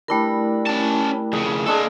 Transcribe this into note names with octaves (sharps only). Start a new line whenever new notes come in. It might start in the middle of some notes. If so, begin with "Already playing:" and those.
G3 A3 D4 E4 A#4 B4
C#4 A5
F2 C#3 G#4
G#3 A#3 D4 G#4 A4